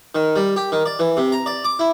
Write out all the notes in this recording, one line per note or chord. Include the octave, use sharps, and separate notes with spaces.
D#3
G3
G4
D#3
D5
E3
C3
A#5
D5
D6
E4